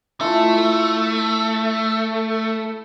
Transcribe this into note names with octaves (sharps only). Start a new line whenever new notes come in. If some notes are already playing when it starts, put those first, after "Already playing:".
A3 E4 F4 A4